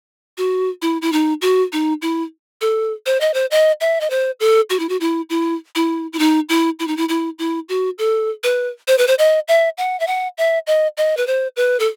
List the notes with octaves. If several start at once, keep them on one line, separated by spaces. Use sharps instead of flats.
F#4
E4
E4
D#4
F#4
D#4
E4
A4
C5
D#5
C5
D#5
E5
D#5
C5
A4
F#4
E4
F#4
E4
E4
E4
E4
D#4
E4
E4
D#4
E4
E4
E4
F#4
A4
B4
C5
B4
C5
D#5
E5
F#5
E5
F#5
E5
D#5
D#5
B4
C5
B4
A4